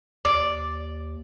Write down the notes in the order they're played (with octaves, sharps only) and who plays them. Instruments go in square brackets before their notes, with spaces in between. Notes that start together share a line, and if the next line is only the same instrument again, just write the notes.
[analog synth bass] D#2 [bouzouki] D5 [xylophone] D6